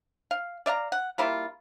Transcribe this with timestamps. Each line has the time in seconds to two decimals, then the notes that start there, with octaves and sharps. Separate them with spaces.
0.31 F5
0.66 D5 E5 F5 A#5
0.92 F#5
1.18 G3 A#3 E4 F4